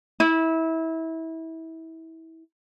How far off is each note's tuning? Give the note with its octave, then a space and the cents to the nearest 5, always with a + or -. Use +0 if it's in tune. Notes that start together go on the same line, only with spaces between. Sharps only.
E4 -25